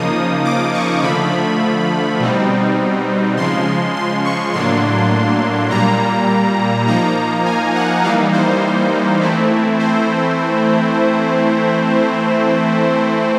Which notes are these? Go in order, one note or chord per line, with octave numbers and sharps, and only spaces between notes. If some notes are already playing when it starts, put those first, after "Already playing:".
Already playing: C#3 F3 A#3 D#4 D#6
D6
C#6
D3 F3 A3 B5
B2 G3 C4 D#4
C#3 F3 G#3 C6
C6
C#6
A2 F#3 A#3 D4 C6
A#2 G3 A#3 A#5
F3 A#3 D#4 A#5
G#5
F#5
E3 G3 A#3 D#4 F5
C5
E3 A3 C4 E4
C5